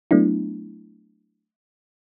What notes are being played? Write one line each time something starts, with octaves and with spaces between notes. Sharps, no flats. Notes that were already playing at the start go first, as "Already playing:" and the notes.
F#3 A3 B3 D4 E4